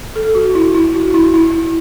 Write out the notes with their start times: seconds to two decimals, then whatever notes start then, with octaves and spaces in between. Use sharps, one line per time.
0.16 A4
0.35 F#4
0.55 E4
0.75 E4
0.95 F#4
1.14 E4
1.34 E4